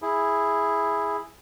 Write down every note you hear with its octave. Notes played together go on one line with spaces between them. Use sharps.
E4 G#4